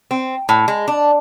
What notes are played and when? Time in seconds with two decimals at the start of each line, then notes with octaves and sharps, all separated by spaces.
0.11 C4
0.49 A2
0.68 G#3
0.88 D4